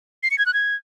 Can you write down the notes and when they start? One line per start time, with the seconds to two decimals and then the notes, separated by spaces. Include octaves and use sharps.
0.23 C7
0.31 C#7
0.38 G#6
0.46 F#6
0.54 G#6